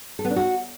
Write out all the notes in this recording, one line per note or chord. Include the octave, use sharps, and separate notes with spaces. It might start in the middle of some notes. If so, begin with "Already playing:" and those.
A4
B3
D4
F#4